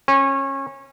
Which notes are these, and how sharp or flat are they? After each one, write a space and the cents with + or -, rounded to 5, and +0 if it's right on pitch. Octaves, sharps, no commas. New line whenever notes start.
C#4 -25